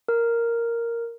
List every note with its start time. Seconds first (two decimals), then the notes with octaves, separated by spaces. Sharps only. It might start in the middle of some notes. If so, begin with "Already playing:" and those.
0.08 A#4